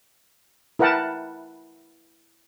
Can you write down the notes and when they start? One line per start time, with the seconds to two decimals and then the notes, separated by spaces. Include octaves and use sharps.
0.79 E4 A#4 B4 F#5 G5 A5